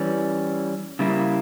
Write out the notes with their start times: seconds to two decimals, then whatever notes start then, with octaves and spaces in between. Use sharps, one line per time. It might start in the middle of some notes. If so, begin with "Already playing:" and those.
Already playing: E3 G3 C#4
0.99 C#3 G3 A#3 E4